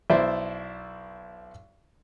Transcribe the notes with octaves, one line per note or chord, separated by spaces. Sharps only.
B1 E4 C5 D5 E5